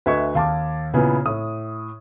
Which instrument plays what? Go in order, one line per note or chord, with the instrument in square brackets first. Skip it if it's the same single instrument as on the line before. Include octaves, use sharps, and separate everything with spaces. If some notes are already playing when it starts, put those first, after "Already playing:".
[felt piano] D2 D#5 G#6 [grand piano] B4 E5 C#6
[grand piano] D#2 [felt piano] F5 A5 D6
[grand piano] A#2 C#3 [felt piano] B3 E4 G#5
[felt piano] A2 [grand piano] D#6